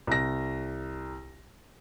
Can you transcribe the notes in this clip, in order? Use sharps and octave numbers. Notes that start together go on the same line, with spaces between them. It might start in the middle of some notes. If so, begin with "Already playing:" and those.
C2 A#6